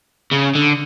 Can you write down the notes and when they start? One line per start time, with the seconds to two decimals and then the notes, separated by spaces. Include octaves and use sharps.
0.31 C#3
0.55 D3